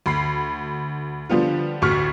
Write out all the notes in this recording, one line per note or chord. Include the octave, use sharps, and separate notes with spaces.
D2 B5 C7
D3 F3 G3 B3 F4
A1 D2 F#4 C#6 F6 B6